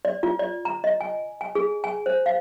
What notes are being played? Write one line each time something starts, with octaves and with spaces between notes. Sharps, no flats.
D5
F4
D5
A#5
D#5
G#5
G#5
G#4
G#5
C5
F5